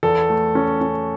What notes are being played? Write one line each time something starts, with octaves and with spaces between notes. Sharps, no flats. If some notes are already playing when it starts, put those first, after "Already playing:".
E2 A4
A3
C#4
C#4